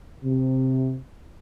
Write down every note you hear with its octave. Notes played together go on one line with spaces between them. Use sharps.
C3